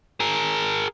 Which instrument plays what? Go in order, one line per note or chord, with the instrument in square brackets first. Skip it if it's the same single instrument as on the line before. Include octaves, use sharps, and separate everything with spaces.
[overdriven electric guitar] G#4 A#4